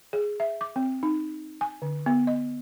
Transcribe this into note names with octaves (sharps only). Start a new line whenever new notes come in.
G#4
E5
D6
C4
D#4
G#5
D3
B3
D#5